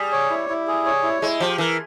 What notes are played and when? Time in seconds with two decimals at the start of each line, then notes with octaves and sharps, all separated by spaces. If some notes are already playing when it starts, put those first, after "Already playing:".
Already playing: G3 G#4
0.12 C#5
0.30 E4
0.49 E4
0.68 G#4
0.86 C#5
1.03 E4
1.22 G#3 E4
1.40 F3 G4
1.58 E3 A#4